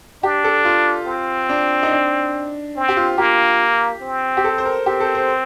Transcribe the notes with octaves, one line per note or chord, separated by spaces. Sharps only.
D4 G4
A4
F4
C4
D4
D#4
D4
C4
G4
F4
A#3 G4
C4
G4
A4
C5
A#4
C4 G4
A4
C5